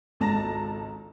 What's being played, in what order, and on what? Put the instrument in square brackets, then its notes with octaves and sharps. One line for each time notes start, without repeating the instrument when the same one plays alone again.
[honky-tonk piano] G#1 C#2 A4 A5 A#5 A#6